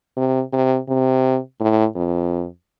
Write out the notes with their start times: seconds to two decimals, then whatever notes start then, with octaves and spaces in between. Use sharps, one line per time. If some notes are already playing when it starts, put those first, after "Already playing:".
0.17 C3
0.53 C3
0.89 C3
1.60 A2
1.95 F2